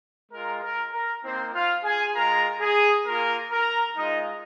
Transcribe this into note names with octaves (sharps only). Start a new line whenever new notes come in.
G#3 F4 A#4
A#4
A#4
A#3 C4 D#4 C5
F4 F5
G#4 G#5
G#3 F4 A#4 A#5
G#4
A#3 F4 A#4
A#4 A#5
G#3 D#4 F4 D#5